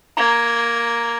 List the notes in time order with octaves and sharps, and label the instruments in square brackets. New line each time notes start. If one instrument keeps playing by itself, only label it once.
[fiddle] A#3 [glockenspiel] A#5 G#6